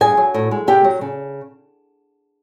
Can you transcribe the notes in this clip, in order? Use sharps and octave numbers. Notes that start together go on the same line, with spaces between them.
G2 G#4 G#5
F#3
A2
G#3
C3 G4 G5
F#3
C#3